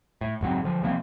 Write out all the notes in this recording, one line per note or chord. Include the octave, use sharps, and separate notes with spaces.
A2
F#1 G#2 F#3 C4
D3 F3
C3 F3 A#3 C4